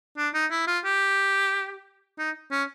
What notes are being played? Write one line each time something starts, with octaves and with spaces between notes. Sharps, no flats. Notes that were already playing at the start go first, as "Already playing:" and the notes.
D4
D#4
E4
F4
G4
D#4
C#4